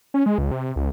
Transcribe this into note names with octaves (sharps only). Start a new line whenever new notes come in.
C#4
G#3
C#2
C3
C#2